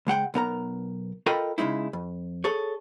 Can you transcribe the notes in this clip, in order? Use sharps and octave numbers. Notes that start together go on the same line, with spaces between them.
C#2 G#3 F#5 G5
B1 B3 A#4 A#5
F4 A4 A#4 D#5 G5 B5
C#3 F#3 G#3 D#4 E4
F2
G#4 A4 C#5